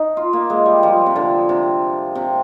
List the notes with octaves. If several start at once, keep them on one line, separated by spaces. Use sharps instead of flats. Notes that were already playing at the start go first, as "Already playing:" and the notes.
Already playing: D#4
F4
A#3
G#3
G3
F3
C3
D3
C3
C3